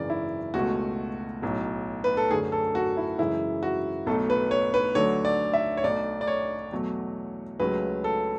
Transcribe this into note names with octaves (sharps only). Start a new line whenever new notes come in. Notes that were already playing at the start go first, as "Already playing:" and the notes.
Already playing: G#1 F#2 C#3 E3 D5
E4
C#2 B2 A3 F#4
B1 A2 F#3
B4
A4
F#2 D3 A3 G#4
A4
F#4
E4
F#2 C#3 E3 G#3 E4
F#4
B1 B2 F#3 A3 A4
B4
C#5
B4
D2 D3 F#3 A3 C#5
D5
E5
C#5
B1 B2 A3 D5
D5
C#5
E2 B2 F#3 A3
C#2 C#3 F#3 A3 B4
A4